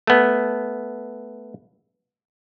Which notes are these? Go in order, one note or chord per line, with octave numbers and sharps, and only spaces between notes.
A3 B3